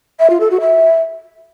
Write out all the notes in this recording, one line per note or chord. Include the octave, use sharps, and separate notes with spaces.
E5
F4
A4
F#4
E5